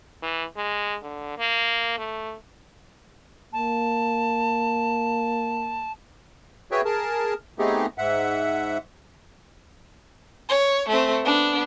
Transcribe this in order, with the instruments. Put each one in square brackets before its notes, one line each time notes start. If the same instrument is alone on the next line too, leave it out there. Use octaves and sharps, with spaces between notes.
[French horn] E3
G#3
D3
A#3
A3
[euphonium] A#3 [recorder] A5
[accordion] F#4 G#4 B4 C#5 E5 G5
G#4 A#4 A5
A3 B3 C4 D#4 G4 G#4
G#2 E5 F#5
[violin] C#5
A3 C4
B3 D4